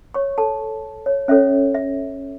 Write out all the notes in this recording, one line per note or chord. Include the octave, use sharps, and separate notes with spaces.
C#5 C#6
A4 A5
C#5
C#4 A4 C#5 E5
E5